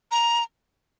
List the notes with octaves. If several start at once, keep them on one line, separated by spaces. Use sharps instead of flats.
A#5